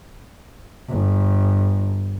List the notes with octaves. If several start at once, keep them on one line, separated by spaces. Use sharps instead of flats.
G1